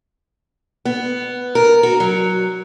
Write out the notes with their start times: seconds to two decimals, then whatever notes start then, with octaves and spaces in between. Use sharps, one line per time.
0.85 B3
1.55 A#4
1.83 F#4
2.00 F#3